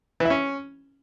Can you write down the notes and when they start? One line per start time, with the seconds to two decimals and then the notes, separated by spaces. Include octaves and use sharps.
0.20 E3
0.25 E4
0.30 C#4